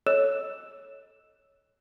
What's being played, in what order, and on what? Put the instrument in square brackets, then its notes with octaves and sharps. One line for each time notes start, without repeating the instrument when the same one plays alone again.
[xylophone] A4 C#5 D#5 E6 F#6 E7